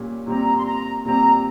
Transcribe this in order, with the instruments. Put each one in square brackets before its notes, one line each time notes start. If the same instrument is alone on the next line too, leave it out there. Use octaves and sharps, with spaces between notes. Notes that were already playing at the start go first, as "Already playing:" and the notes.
Already playing: [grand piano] A#2 G3 C#4
[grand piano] A#2 G3 C4 [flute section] A#5
[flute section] C6
A#5
[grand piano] A#2 G3 C4 [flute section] A#5